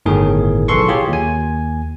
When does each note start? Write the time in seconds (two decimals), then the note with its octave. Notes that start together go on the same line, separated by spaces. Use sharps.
0.06 G1 A2 D#3 G#4
0.68 B1 E3 A4 C6 C#6
0.88 F4 G4 G#4 C#5
1.09 D#2 G#5